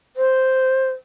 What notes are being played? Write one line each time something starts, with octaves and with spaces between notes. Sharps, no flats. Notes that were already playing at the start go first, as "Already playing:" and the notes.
C5